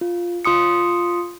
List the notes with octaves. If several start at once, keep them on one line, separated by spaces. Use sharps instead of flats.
F4
F4 C6 D#6 C#7